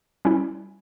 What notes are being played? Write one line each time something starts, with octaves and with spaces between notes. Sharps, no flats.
G3 C#4 E4